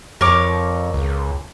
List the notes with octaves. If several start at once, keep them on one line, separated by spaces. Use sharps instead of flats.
F2 A#4 C#5 D6
C#2